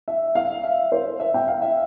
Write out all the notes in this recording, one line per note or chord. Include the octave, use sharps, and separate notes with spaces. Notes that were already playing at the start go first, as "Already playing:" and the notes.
E5
F5
E5
C5
E5
G5
F5
E5